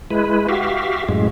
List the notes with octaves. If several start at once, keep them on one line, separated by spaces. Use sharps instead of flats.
G#3 E4 B4
F#4 G4 E5 F5
F#2 A2 G#3